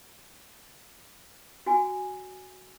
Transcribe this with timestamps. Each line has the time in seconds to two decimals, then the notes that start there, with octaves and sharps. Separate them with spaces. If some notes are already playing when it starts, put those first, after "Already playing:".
1.66 F#4 G#5